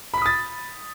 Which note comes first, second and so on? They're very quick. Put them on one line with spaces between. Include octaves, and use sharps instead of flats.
B5 B6 D#6 A6